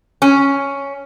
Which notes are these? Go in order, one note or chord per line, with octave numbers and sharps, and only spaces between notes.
C#4